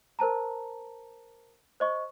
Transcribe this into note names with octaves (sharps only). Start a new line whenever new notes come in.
A#4 C5 A5 A#5
C5 D#5 C#6